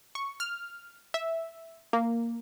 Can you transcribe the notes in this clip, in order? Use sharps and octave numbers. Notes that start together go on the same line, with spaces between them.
C#6
F6
E5
A#3